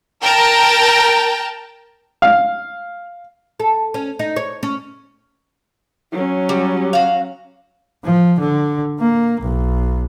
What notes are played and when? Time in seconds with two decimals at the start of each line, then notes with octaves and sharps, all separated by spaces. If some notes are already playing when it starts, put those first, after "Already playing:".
0.22 A#4 G5 A5 A#5
2.22 F5
3.60 A4
3.94 C#4
4.19 D#4
4.36 C#5
4.63 C#4
6.12 F#3 C#4
6.49 G3
6.93 F#4 F5
8.05 F3
8.40 D3
9.00 A#3
9.41 B1